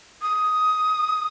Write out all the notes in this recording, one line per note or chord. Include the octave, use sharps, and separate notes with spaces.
D#6